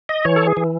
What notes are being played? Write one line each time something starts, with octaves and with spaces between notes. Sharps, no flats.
D#5
E3 C#5
A4
G#4
E3